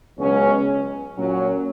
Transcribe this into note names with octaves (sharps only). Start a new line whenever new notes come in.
C#2 B2 F#3 C#4
A#2 F#3 C#4